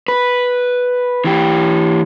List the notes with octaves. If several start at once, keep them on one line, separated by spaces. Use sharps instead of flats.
B4
E3 G4